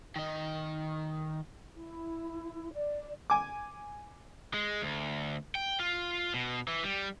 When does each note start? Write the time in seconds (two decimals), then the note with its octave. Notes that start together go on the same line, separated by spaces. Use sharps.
0.16 D#3 D#5
1.75 E4
2.73 D5
3.30 G#5 D6
4.54 G#3
4.82 D2
5.55 G5
5.80 F4
6.34 B2
6.68 E3
6.84 G3